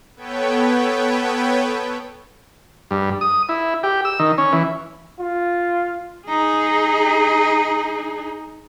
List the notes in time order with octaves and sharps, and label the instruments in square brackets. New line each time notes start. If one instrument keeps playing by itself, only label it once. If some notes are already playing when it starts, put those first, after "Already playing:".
[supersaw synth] B3 A4 B4 C#5 G5
[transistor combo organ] G2
D#6
E4
G4
E6
D#3
C#4
E3
[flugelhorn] F4
[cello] D#4 G#4